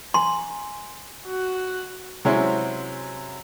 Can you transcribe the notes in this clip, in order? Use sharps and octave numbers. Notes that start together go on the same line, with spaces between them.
G#5 A#5 C6
F#4
C3 F#3 G#3 C4 C#4 E4